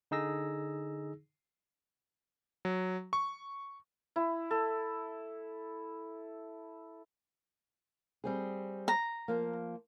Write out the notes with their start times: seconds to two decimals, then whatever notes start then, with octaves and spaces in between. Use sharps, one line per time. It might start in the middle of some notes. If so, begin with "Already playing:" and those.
0.11 D3 D#4 G#4 E6 A#6
2.65 F#3
3.13 C#6
4.16 E4
4.51 A4
8.24 G3 C4 G#4
8.88 A#5
9.28 F3 A#3